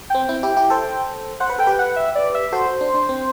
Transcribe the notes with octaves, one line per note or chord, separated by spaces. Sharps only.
C4 G5
C4 E4
E4 G4
E4 G4
A4 C5
C5 F#5
B4
A4 G5
G4 B4
F#5
E5
D5
E5
F#4 A4 C5
D4
D4
C4